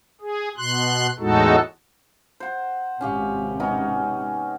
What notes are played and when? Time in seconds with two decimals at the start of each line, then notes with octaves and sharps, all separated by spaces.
0.21 G#4
0.57 B2 C6 F#6
1.19 E2 A2 G#3 D#4 F#4 A4
2.40 C5 F#5
3.01 G#1 C3 C#4 G4 F5
3.60 B3 C#4 D#4